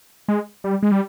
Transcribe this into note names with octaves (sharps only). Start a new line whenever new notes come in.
G#3
G3
G#3
G3